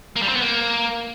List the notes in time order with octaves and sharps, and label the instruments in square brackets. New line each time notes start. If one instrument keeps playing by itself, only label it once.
[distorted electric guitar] A#3
G3
C4
B3
A#3